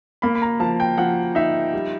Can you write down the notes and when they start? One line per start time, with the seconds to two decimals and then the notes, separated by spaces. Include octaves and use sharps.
0.22 A#3 B5
0.35 B5
0.42 A#5
0.60 F3 A5
0.80 G5
0.98 F3 F#5
1.35 D#4 E5
1.73 G3